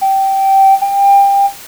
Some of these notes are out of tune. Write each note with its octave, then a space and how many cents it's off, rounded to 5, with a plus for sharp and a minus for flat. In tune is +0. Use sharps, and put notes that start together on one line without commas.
G5 -15
G5 +25